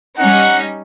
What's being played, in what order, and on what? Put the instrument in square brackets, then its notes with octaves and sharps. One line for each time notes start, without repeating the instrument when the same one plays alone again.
[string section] G3 C#4 D#4 [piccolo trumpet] F#5